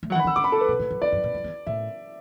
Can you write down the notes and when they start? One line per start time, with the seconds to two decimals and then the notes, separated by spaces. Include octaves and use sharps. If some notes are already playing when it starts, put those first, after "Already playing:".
0.03 A3
0.10 E3 F#3 F#5
0.20 B5
0.24 E3
0.27 E6
0.36 D3 D6
0.44 B5
0.52 A4
0.61 B4
0.69 B2
0.79 A2
0.90 F#2
1.02 E2 D5
1.12 F#2
1.24 A2
1.34 F#2
1.44 E2
1.67 A2 E5